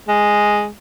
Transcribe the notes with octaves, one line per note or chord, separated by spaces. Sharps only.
G#3